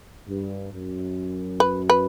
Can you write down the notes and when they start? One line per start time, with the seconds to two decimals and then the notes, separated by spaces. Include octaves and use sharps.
0.27 G2
0.71 F#2
1.60 B4
1.90 B4